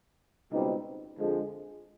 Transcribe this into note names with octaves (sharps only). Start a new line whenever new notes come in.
C#2 B2 G3 C4 D#4
F2 D3 F3 G#3